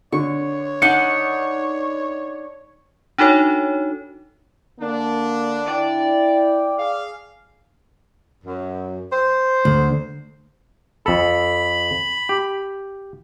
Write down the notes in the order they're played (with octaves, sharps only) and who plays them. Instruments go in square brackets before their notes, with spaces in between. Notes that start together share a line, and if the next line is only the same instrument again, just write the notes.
[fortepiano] D3 [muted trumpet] C#5 [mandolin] C#6
[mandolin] D4 D#4 F#5 [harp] C#7
[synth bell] D4 D#4 F#4 A4 C#5
[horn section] D3 D4 [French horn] A#3
[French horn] E4 [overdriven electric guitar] D5 [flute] G5
[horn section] G#4 F5
[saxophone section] F#2
C5
[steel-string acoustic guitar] D2
[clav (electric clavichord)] F2 A4 [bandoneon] B5
[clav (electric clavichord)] G4